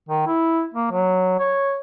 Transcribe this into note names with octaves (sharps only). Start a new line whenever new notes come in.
D#3
E4
A#3
F#3
C#5